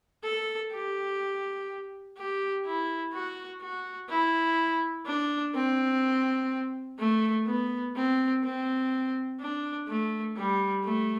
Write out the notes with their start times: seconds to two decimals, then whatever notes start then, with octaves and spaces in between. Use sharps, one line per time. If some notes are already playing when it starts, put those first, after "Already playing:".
0.24 A4
0.73 G4
2.18 G4
2.66 E4
3.14 F#4
3.62 F#4
4.10 E4
5.06 D4
5.55 C4
6.99 A3
7.47 B3
7.96 C4
8.44 C4
9.40 D4
9.88 A3
10.37 G3
10.85 A3